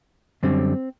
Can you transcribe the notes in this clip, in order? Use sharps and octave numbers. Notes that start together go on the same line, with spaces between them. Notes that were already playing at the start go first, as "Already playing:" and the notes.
F#2 D3 G3 C4